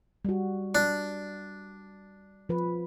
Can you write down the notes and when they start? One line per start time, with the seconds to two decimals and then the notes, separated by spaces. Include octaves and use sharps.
0.25 G3 F#4
0.75 D4
2.49 F3 B4